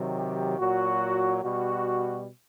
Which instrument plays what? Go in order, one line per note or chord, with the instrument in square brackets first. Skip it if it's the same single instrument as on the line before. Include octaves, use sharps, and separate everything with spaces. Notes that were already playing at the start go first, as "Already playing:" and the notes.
Already playing: [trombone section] C3 D#3 F#3
G4
A#2 F#3 F#4
B2 G3 F#4